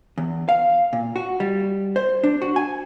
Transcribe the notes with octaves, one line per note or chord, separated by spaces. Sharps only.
E2
F5
A#2
F#4
G3
C5
D4
F#4
G#5